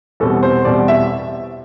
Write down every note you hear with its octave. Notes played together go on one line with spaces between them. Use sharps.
E2 B2 G3 C4 A4
C5
E2 B2 G3 C4 D5
E5